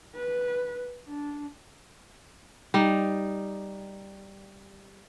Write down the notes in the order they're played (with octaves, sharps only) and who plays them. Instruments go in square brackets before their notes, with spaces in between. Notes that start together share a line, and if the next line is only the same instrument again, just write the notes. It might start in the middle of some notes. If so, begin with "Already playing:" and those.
[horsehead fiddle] B4
D4
[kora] G3 D#4